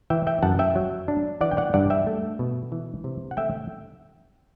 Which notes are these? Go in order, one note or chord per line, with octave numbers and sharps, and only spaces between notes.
E3 E5 G5
E5 G5
F#2 F#5 A5
E5 G5
F#3
D4
E3 D5 F#5
G5
D5 F#5
G2 D5 F#5
E5 G5
A3
B2
E3
C3
F#5
A3 E5 G5